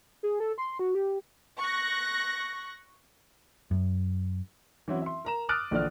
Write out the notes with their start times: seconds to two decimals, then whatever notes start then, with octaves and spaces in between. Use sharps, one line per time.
0.23 G#4
0.40 A4
0.58 C6
0.79 F#4
0.95 G4
1.60 C#6 F#6 A#6
3.71 F#2
4.88 E3 F#3 C4 C#4 E4 F#4
5.02 E5 C6
5.25 A#4 A#5 E7
5.49 D6 D#6 F6 F#6 A6 D7
5.71 A#1 D3 E3 D5 F6